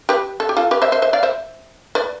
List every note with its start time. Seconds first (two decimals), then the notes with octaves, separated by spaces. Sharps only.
0.09 G4 B4
0.40 A4
0.49 G4
0.57 F4 A4
0.71 G4 B4
0.82 C5 E5
0.92 C5 E5
1.02 C5 E5
1.13 D5 F5
1.23 C5 E5
1.95 B4 D5